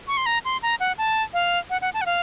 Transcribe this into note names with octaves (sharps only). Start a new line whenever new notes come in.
C#6
C6
A#5
C6
A#5
F#5
A5
F5
F#5
F#5
A5
F#5
F5